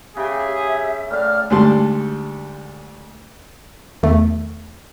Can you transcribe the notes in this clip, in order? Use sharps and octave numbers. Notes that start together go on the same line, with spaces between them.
C#3 G4 G#4 E5 G5
A2 D5 F5 F6
D2 G#2 G3 A5 C6
E2 D#3 A3